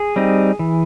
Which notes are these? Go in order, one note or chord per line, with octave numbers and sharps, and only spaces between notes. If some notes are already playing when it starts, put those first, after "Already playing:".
Already playing: G#4
G3 C4 D#4
E3